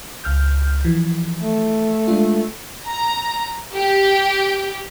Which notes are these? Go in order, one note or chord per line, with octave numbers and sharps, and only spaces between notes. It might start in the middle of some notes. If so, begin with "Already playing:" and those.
C#2 F6 G6
E3 F3
A3
G#3 D4 F4
A#5
G4